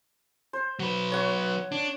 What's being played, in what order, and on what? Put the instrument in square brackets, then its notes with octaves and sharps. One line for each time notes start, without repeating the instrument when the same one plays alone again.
[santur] C5
[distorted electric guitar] F#3 B4
[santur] C#5 F#5 C#6
[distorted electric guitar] D4